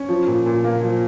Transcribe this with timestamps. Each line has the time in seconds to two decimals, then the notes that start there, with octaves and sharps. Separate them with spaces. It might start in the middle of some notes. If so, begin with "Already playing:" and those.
Already playing: C#4
0.09 F3
0.27 A#2
0.46 A#2
0.64 A#3
0.83 F3